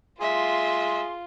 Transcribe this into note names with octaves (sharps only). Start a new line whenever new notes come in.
F4 G#4 E5 C6